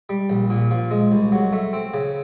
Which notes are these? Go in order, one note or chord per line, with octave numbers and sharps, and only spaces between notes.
G3
A#1
A#2
F3
G#3
C2
F#3
A3
C4
C#3